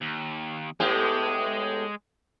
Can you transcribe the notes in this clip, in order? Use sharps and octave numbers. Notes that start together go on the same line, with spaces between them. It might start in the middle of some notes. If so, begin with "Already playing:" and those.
D#2
A2 G#3 B3 G4 G#4